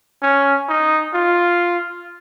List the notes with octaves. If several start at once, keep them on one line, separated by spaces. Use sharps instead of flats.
C#4
D#4
F4